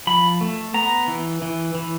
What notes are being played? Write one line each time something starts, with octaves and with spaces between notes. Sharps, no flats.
F3 B5
A3
B3 A#5
E3
E3
E3